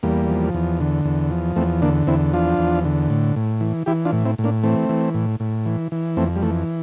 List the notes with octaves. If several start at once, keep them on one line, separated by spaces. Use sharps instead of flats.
E2 G3 A#3
F3
E2
D3
E2
F3
E2 A3 C4
D3 A#3 D4
E2 C4 E4
F3 D4 F4
E2
D3
A2
A2
E3
E3 E4 G4
D4 F4
A2
C4 E4
A2
A#3 D4
E3 A3 C4
E3
A2
A2
E3
E3
F2 A3 C4
G3
E3 A3